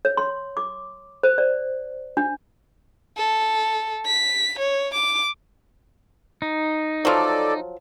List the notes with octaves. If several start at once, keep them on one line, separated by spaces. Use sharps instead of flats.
C#5
C6
D6
C5
D5
D4
A4
B6
C#5
D6
D#4
F3 F#3 A4 D5